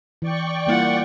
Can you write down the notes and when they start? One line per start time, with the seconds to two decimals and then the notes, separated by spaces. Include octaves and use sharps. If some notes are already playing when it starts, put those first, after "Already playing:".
0.22 E3 D5 G5 C#6
0.67 G3 A#3 E4 F4 F#5